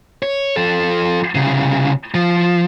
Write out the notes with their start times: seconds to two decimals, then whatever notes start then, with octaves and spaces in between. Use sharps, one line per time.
0.23 C#5
0.56 F3 A4
1.35 C2 C#3
2.14 F3